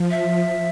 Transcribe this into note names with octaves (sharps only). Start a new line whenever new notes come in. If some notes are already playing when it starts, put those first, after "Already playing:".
Already playing: F3
E5